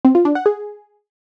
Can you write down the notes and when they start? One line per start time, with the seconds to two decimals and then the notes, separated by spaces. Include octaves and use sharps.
0.05 C4
0.15 F4
0.25 D4
0.35 F#5
0.46 G#4